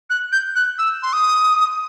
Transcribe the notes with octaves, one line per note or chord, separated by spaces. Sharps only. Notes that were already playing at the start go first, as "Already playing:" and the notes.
F#6
G6
F#6
E6
C6
D#6